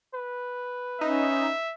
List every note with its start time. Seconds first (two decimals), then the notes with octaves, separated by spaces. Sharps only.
0.14 B4
1.01 C#4 D#4 E5